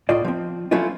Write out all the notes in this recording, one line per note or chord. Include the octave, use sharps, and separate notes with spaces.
C#2 A2 F4 D5 D#5
F3 C4
F3 F#3 A3 C#4 E4 F4